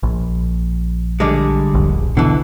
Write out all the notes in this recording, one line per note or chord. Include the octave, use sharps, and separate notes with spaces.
A#1
D3 G3 G#3
D#1 A#1
B2 D3 E3